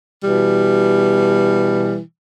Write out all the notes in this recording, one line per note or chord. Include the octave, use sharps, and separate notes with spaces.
B2 E3 G3